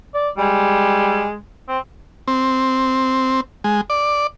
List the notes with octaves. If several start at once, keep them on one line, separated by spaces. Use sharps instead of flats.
D5
G3 G#3
C4
C4
G#3
D5